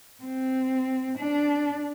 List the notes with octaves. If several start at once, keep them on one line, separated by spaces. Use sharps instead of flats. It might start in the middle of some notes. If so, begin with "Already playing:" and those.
C4
D4